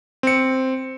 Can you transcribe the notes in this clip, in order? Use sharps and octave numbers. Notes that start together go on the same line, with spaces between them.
C4 C#7